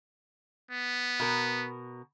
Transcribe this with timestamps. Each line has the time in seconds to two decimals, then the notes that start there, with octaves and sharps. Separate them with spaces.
0.71 B3
1.20 B2 A#4